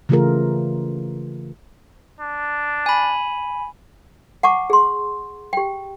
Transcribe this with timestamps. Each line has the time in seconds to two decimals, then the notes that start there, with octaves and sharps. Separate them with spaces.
0.09 C#3 E3 A3 F4 G#4 A#4
2.20 D4
2.86 G#5 B5
4.43 F#5 A5 C#6 D6
4.70 G#4 C6
5.53 G4 G5